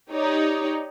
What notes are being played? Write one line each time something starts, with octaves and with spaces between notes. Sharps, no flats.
D#4 G4 C#5 D5